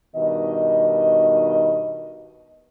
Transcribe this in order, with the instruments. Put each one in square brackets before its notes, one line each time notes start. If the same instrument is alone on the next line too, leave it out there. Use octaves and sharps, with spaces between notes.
[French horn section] G2 B2 D#3 D#5